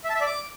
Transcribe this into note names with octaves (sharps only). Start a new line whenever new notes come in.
E5
A5
E5
D5
D6